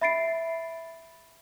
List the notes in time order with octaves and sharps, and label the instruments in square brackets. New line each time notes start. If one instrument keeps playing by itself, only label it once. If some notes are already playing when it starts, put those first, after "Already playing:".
[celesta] E5 B5 A6 C7 D7